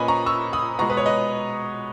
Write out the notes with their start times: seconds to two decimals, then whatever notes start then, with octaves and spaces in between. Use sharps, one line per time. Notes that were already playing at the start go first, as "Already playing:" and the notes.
Already playing: A#2 A#3 C#4 B4 D#5 G#5 B5
0.08 A#5 C#6
0.26 C#6 E6
0.53 B5 D#6
0.79 B2 G#3 B3 A#5 C#6
0.90 B4
0.97 C#5
1.06 B4 D#5